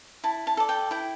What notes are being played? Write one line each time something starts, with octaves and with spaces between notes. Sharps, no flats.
E4 A5
A5
A4 D5
G5
E4 G5